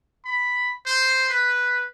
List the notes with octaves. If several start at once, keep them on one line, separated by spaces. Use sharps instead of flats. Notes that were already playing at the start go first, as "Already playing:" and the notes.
B5
C5
B4